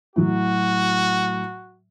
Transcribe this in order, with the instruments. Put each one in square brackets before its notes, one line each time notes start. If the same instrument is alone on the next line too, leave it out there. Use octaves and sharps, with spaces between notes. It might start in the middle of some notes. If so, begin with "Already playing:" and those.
[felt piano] A2 F#3 [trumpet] F#4